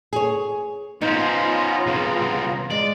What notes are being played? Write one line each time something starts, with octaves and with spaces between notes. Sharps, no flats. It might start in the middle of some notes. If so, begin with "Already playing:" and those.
G#4 C#5
B3 C#4 D#4 F4 C5 A#5
C2 C#3
G#3 D5